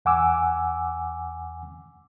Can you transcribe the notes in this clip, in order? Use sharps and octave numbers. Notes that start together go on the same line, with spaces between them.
E2 F#5 G#5 D6 E6